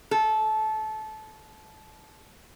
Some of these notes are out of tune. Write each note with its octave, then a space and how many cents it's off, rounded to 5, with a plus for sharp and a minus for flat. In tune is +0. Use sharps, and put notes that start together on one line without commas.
A4 -20